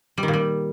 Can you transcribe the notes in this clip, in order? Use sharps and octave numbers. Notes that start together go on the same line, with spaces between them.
G3
D#3
A#2
G3